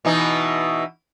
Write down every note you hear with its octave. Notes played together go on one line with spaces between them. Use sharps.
B2 E3 D#4